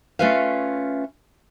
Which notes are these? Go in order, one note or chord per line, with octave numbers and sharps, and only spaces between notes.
A3 C#4 F4 B4 E5 F5